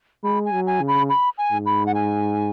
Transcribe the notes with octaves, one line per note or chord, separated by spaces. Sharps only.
G#3 B5
G#5
F#3
G#5
C#3
B5
B5
G#5
G#2
B5
F#5
G#5